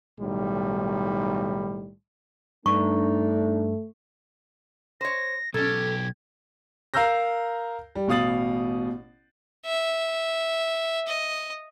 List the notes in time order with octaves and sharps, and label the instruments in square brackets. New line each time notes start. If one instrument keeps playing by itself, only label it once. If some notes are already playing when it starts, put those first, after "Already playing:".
[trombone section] B1 A2 D#3 G3
[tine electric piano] G2 [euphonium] A3 [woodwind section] D4 D#4 [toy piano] C#6
[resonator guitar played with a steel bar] C5 C#5 [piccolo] A#6
[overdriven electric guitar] B1 G4 [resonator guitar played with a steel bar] C#4 A4 [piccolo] G#6
[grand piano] A#4 F5 A#5 E6 G6 A#6
G3
A1 B2 F5 D#6 A6 F#7
[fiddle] E5
D#5